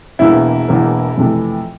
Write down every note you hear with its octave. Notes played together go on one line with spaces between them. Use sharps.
E1 E2 E3 A#3 E4
E1 E2 E3 A#3
F2 C3 E3 A3